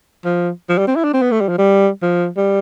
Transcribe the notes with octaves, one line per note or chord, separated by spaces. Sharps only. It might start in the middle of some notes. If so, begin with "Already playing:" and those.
F3
F3
G3
C4
E4
D4
C4
B3
A3
G3
F3
G3
F3
G3